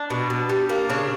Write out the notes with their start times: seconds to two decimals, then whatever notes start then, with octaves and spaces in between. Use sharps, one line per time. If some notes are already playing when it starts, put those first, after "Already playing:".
Already playing: D4
0.10 B2
0.30 B2
0.49 G3
0.69 A#3
0.90 C#3 D4